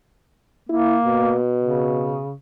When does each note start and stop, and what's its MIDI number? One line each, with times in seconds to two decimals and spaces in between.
0.70 1.35 58
0.70 0.97 64
1.06 2.25 47
1.60 2.33 49